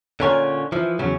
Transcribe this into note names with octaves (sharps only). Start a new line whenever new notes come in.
A#2 D3 C#4 F4 C#5 G#5
E3 F3
E2 C#3 F#3 C#4